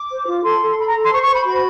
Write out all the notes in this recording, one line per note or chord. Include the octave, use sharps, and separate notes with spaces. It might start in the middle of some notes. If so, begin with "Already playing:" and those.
Already playing: D6
C5
F4
A4 C6
A4
A4 B5
A#5
A4
C6
C5 C#6
C#6
C5
B5
F#4 B5